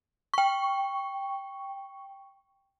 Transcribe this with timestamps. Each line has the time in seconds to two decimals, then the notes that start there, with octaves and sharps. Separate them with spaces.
0.34 G5 C#6